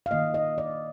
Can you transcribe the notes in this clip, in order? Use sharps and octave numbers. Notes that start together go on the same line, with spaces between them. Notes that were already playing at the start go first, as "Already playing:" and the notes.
F5
D#3 A#3 D#5
D#5
D5